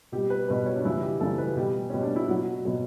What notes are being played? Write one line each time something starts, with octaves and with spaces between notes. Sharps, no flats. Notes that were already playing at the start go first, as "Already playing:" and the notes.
B2 G3 G4
B4
B2 G3 B4
C#5
D4
F#2 C#3 E3 G3 E4
G4
F#2 C#3 E3 G3 A4
B4
B2 G3 G4
B2 G3 C#4
D4
E4
B2 F#3 F#4
B2 F#3